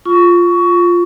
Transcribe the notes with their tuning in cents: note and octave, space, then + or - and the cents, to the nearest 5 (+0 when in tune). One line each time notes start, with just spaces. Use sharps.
F4 +0 C#6 +20